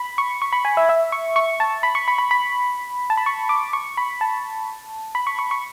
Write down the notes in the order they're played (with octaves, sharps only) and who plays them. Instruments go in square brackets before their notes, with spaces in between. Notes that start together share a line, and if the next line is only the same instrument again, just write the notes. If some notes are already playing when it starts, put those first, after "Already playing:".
Already playing: [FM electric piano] B5
C#6
C#6
B5
G#5
E5
E5
C#6
C#6
A5
B5
C#6
B5
B5
B5
A5
B5
C#6
D6
C#6
B5
A5
B5
C#6
C#6
C#6